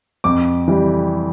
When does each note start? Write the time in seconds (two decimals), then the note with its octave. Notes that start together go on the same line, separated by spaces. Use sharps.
0.24 F2 D6
0.68 E3 G3